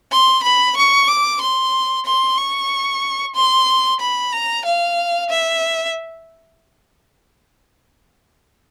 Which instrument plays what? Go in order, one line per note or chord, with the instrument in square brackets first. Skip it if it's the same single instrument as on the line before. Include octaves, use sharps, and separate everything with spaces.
[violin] C6
B5
C#6
D6
C6
C6
C#6
C6
B5
A#5
F5
E5